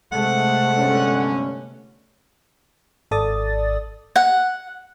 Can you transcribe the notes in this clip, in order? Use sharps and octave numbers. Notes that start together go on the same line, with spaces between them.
C3 G#3 A3 F#5
G1 D3 C#4
G#1 A4 D5 D#6 A6
F#5